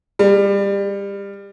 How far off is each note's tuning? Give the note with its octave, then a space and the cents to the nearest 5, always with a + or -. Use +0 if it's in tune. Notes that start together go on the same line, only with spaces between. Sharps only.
G3 +25